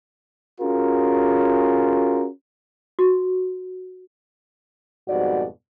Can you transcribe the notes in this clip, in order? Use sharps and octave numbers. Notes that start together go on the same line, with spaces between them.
C#4 F4 F#4 G#4 A#4
F#4
F2 G#2 B2 G3 F#4 D5